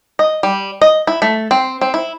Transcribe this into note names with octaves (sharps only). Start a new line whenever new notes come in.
D#5
G3
D#5
E4
A3
C4
C4
E4